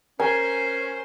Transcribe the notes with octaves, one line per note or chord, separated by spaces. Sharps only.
C#4 A#4 C5 G#5 C6